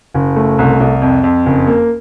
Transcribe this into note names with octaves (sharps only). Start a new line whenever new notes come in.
F#1
A3
C2
C2
F2
F2
F#1
A#3